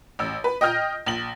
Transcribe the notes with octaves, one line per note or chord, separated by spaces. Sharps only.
A1 E6
B4
D#5 G5 D#6 F6 G6 A#6
A#1 F#7